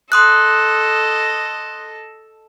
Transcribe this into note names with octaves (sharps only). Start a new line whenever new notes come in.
A4 D#5 C6 D#6 F#6